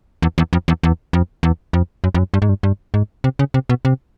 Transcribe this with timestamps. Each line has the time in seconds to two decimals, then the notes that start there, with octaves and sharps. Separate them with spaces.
0.22 E2
0.38 E2
0.53 F2
0.68 E2
0.83 E2
1.13 F2
1.43 E2
1.73 F2
2.04 F#2
2.15 F2
2.19 F#2
2.34 G2
2.42 G#2
2.49 G2
2.63 G2
2.94 G#2
3.24 C3
3.39 C#3
3.54 C3
3.69 B2
3.85 C3